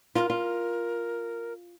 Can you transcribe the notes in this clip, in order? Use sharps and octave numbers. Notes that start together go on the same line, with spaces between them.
F4 A#4
F4